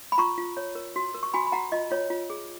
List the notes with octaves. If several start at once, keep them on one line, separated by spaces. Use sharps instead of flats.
B5
F4 A#5 C#6
F4
C#5
A#4
F#4
A#4
C#6
F#4 G#5 B5
B5
F#4 F#5 A#5
F4 D#5
F4 C#5
F4
G#4